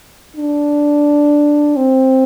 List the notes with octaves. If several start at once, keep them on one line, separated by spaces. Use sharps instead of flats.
D4
C4